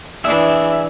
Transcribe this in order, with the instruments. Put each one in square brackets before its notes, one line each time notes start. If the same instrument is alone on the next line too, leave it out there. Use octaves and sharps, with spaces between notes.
[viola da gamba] E3 D4 [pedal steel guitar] G#4 E5